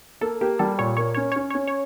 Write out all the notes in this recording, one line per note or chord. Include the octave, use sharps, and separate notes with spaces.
A#3 A4
A#3 G4
G3 A4
A#2 C#5
A#3 C#5
C#4 C#5
C#5
C#4
C#5
C#4
C#5